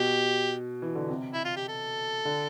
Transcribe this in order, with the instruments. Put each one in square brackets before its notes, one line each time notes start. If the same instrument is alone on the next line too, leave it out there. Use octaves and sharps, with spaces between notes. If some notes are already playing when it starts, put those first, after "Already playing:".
Already playing: [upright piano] B2 [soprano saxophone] G4
[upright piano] E3
D3
C3
[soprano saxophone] E4
F4
G4
A4
[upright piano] D3